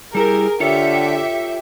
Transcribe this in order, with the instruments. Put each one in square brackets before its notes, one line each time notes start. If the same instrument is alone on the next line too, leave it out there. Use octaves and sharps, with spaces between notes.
[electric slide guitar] G3 E4 G4 [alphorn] G#4 [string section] A#4
[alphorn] D3 [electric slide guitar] F4 A4 C#5 [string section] G4 E5